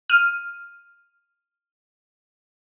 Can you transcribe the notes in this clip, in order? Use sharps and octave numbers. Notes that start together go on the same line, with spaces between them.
F6 D#7